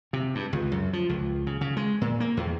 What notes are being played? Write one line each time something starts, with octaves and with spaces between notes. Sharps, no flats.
C3
G2
C#2
F#2
F3
C#2
C#3
C#3
G#3
A#2
A#3
E2